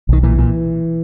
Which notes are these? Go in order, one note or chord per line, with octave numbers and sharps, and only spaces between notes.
B1 D#3
A#2 E3
A#2